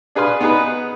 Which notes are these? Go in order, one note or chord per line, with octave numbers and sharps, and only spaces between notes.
D4 G#4 B4 F5 C6
B3 D#4 G#4 B4